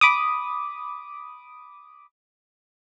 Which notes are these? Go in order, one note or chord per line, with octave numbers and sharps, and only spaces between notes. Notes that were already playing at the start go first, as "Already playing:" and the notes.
B5 D6 D#6